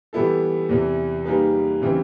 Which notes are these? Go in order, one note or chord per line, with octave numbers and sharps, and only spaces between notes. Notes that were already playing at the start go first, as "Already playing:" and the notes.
E3 G3 B3 E4 A4
E2 C3 E3
G3 A#3 D#4 G#4 B4
C#3 E3 G3 C4